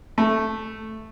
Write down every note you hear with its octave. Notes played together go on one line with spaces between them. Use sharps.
A3